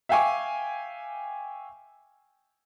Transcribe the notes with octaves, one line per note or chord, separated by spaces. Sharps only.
E5 F5 G5 G#5 C#6 D6